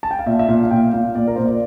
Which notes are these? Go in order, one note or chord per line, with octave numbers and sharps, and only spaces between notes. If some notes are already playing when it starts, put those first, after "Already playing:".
A5
G5
F5
A#2 E5
E5
A#2 F5
F5
A#2 G5
A#2 F5
A#2 D5
A#4
A#2 C5
D5